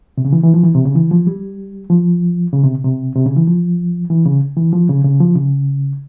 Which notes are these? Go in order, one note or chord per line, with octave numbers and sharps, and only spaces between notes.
C3
C#3
E3
E3
F3
E3
C3
C#3
E3
F3
G3
F3
C#3
C3
C3
C3
C#3
E3
F3
E3
C#3
E3
F3
C#3
C#3
F3
C#3